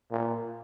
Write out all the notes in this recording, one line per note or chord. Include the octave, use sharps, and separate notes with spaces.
A#2